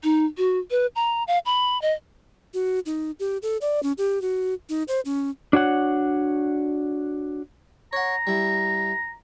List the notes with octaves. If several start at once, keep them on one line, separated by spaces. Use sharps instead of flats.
D#4
F#4
B4
A#5
F5
B5
D#5
F#4
D#4
G4
A4
D5
C#4
G4
F#4
D#4
C5
C#4
D4 F#4 C#5 F#5
C#5 F#5 A#5
G3 E4